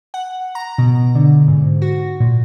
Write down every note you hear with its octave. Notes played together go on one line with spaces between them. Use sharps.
F#5
A#5
B2
D3
G#2
F#4
A#2